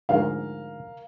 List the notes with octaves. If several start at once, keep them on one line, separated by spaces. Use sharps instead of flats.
D2 G#2 F3 A#4 F5